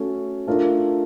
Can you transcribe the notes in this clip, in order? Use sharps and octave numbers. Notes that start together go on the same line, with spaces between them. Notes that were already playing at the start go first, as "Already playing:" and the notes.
Already playing: A3 C#4 F#4 A4
A3 D4 F4 A#4